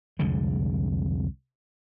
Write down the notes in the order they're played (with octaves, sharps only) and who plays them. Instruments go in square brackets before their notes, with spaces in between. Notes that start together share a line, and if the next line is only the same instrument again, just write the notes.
[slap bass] C2 F2 D3 G#3